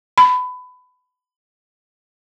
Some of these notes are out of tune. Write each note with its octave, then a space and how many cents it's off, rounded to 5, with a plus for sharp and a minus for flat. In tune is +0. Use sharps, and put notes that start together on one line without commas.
B5 +20